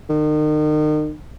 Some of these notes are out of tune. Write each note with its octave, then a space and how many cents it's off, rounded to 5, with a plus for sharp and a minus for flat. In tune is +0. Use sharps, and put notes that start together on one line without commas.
D#3 -35